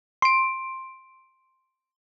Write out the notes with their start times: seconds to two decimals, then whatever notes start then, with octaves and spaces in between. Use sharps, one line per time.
0.22 C6 D7